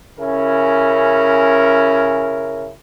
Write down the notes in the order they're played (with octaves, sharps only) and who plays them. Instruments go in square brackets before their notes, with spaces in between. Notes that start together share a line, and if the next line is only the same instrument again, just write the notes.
[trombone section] C#3 C#4 E4 A#4